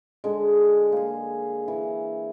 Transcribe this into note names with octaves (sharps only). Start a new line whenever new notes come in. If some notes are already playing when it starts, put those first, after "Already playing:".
D3 G#3
A#3 G#4
E3